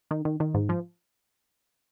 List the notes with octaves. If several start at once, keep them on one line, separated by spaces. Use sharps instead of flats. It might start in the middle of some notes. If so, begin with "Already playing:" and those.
D#3
D#3
D#3
G#2
F3